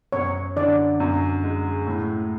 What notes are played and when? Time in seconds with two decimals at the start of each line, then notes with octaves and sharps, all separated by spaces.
0.12 F#2 C#5
0.56 D3 D5
1.00 F#2
1.43 G#3
1.86 A2